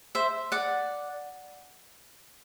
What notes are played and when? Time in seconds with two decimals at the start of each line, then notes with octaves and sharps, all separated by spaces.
0.15 C5 E5
0.52 D5 F#5